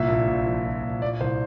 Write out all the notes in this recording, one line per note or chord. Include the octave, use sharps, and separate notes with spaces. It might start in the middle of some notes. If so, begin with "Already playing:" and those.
Already playing: C2 A#2 E5
A#1
A#1
F3
A#2
A#1
A#2 D5
C2 C5